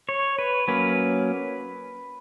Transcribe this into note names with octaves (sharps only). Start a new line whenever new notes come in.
C#5
B4
F#3 A#3 C#4 B4